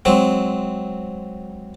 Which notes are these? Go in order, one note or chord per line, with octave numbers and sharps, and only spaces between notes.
F#3 G#3 C4